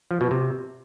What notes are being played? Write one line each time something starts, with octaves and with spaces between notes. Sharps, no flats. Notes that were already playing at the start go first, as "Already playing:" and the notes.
F3
B2
C3